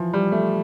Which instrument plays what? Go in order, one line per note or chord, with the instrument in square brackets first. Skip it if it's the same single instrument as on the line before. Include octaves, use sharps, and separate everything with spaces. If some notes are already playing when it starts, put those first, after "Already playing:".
Already playing: [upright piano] E3 F3
G3
A3